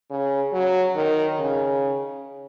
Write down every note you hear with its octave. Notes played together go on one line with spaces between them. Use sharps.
C#3
F#3
D#3
C#3